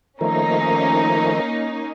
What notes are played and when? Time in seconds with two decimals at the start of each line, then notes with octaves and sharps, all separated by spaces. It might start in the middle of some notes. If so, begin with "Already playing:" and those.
0.21 D#3 F3 A3 A#3 C#4 D#4 A#5